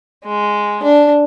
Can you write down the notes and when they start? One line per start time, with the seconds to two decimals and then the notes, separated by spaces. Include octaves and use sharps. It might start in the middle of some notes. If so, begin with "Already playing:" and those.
0.25 G#3
0.83 D4